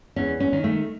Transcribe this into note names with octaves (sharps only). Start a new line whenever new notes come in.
E2 C#4
C#4
D#3
A3